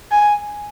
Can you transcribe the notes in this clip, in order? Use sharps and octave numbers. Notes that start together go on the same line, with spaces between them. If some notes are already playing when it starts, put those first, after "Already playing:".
G#5